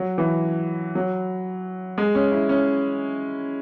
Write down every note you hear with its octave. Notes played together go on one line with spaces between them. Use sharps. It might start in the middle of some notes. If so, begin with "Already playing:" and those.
Already playing: F#3
E3
F#3
G#3
C#4
E4
C#4